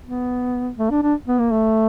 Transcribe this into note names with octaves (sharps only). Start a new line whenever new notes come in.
B3
A3
D4
D4
B3
A#3
A3